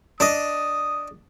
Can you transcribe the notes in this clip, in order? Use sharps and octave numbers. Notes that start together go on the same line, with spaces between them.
D4 D#5 D#6